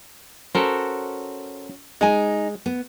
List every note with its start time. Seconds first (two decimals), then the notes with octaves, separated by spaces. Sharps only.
0.55 C#4 F#4 A4 A#4 C5
2.01 G#3 D#4 G#5
2.66 B3